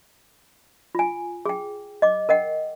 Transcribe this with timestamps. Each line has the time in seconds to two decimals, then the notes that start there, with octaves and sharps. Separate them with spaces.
0.95 F4 G#5
1.46 G#4 G5
2.02 D#5 D6
2.29 A#4 D#5 F#5 G5